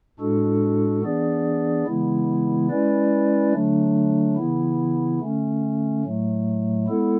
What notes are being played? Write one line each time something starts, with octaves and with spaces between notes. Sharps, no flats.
A2 G#3 D4 F#4 A4
E3 B3 D4 G#4 D5
C#3 E3 G#3 B3 E4
G#3 C#4 E4 B4 D5
D3 F#3 A3 D4
C#3 E3 B3 E4
D3 A3 C#4
A2 F#3 A3
G#3 B3 E4 A4